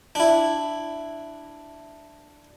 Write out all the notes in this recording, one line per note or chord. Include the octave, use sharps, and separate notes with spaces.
D4 E4